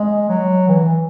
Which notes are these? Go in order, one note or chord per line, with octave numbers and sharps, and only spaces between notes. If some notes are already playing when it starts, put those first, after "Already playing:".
Already playing: G#3
F#3
E3